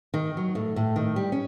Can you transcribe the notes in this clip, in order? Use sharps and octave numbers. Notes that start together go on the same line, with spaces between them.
D#3
F#3
A2
A2
D#3
G3
C#4